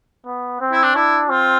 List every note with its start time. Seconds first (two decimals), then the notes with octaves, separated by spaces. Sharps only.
0.26 B3
0.60 C4
0.72 E4
0.83 D4
0.95 D4 E4
1.29 C4 F4